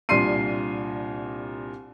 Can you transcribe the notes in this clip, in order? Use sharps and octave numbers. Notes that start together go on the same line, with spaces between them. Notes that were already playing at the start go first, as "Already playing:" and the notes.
C2 A#2 D4 C6 C7 D#7